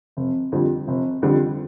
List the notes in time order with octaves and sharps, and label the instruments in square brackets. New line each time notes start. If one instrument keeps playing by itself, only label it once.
[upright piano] F1
F2 D3 G3
F1
F2 D3 G3